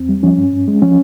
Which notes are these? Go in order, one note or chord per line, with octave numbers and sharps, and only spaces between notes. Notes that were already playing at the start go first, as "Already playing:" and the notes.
Already playing: E2 C4
G3
F3 C#4
G2
G2
G#3
F3 C#4